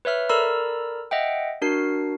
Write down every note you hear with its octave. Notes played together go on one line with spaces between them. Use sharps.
B4 C#5 E5 F6
A4 A#4 D5 A#5 B5 E6
D#5 E5 F#5 G5
D4 F#4 A#4 C7